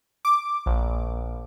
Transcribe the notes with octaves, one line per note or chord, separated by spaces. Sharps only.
D6
A#1